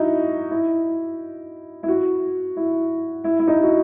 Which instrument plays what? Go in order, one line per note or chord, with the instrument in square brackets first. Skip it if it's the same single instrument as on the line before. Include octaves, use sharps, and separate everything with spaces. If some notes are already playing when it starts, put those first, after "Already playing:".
Already playing: [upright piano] D#4 E4 F#4
E4
E4
F#4
E4
E4
E4
D#4
F#4